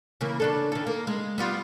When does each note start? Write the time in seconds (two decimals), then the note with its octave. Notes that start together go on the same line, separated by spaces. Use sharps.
0.21 C#3 E3 A#3
0.40 C#3 D4 A4
0.72 D#3 A4
0.87 A#3
1.07 G#3
1.38 G3 B3 F4